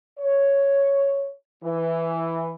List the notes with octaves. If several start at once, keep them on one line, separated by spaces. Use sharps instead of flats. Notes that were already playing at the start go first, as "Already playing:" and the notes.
C#5
E3